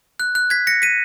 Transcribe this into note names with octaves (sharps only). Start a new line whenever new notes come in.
F#6
F#6
G#6 B6
A#6 C#7
B6 D#7